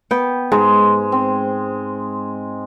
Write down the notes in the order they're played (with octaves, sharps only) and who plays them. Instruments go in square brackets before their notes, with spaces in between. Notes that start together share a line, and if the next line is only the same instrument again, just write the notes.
[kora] B3 G5
[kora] G#2 [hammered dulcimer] G#3
[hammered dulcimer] C4